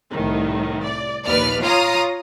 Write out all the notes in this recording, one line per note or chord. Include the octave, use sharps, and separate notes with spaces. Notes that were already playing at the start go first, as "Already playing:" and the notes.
C2 A2 D#3
D5
A#1 D#2 B4 D5 F6
F4 C#5 F5 A#5 D#6